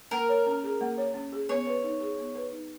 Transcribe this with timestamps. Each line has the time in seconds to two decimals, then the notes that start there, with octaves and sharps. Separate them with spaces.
0.11 A#3 A#4
0.29 C#5
0.46 C#4
0.64 G#4
0.81 A#3
0.98 C#5
1.14 C#4
1.32 G#4
1.49 B3 C#5
1.67 B4
1.83 D#4
2.01 G#4
2.18 B3
2.35 B4
2.52 D#4